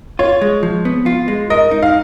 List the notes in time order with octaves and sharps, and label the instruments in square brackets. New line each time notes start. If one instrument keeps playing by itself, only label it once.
[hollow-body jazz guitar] F4 [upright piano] C#5
[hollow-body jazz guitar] G#3
F3
B3
F4
G#3
[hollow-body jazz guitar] A#4 [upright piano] D#5
[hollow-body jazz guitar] D#4
[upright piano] F5